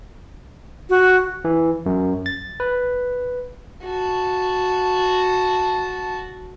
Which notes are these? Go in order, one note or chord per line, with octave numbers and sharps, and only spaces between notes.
F#4
E3
F#2
A6
B4
F#4 A5